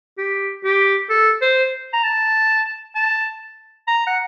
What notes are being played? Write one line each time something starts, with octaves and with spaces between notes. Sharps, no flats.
G4
G4
A4
C5
A#5
A5
A5
A#5
F#5